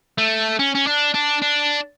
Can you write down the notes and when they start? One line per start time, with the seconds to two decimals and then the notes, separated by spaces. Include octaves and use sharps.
0.18 A3
0.59 C#4
0.75 C#4
0.87 D4
1.14 D4
1.42 D4